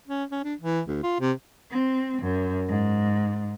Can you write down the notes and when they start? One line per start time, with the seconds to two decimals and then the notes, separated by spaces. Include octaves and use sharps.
0.08 C#4
0.31 C#4
0.44 D4
0.61 E3
0.88 D2
1.03 F4
1.20 C3
1.69 C4
2.21 F#2
2.66 G#2